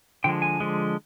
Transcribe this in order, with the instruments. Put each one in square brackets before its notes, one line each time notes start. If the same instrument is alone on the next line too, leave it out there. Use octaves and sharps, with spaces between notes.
[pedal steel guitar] D3 F3 G#3 G5
G#5
D3 F3 G#3